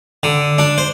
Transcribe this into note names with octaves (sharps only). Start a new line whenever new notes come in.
D3
D4
C5